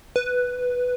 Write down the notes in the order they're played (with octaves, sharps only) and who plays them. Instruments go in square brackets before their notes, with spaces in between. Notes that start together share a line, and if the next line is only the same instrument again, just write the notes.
[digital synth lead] B4